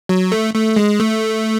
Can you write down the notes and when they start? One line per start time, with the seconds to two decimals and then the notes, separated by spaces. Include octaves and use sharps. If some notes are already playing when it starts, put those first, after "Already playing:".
0.09 F#3
0.32 A3
0.55 A3
0.76 G#3
1.00 A3